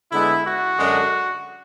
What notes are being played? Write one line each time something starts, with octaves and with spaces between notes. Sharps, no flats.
D3 G#3 B3 E4
F#4
F#2 D3 G#3 D4